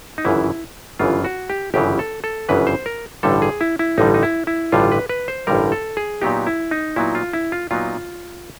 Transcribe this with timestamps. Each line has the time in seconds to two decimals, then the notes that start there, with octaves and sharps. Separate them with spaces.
0.18 D#4
0.25 G1 F#2 C#3 E3 E4
0.99 G1 F#2 C#3 E3 F4
1.25 F#4
1.50 G4
1.74 G1 F#2 C#3 E3 G4
1.99 A4
2.24 A4
2.49 G1 F#2 C#3 E3 B4
2.67 C5
2.86 A#4
3.23 A1 G2 D3 G3 A4
3.42 G#4
3.61 E4
3.79 E4
3.98 A1 G2 D3 G3 D#4
4.14 D#4
4.23 E4
4.47 E4
4.72 A1 G2 D3 G3 F4
4.92 B4
5.09 B4
5.28 C5
5.47 A1 G2 D3 G3 A#4
5.72 A4
5.97 G#4
6.22 A#2 F#3 B3 D#4 G4
6.47 E4
6.71 D#4
6.96 A#2 F#3 B3 D#4 E4
7.15 F4
7.33 E4
7.52 F4
7.71 A#2 F#3 B3 D#4 F4